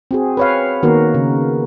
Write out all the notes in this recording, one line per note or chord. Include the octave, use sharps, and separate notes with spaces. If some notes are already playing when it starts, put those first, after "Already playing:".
C4 F#4 G#4
B4 C#5 F5
D#3 A#3 B3 F#4 A#4
C#3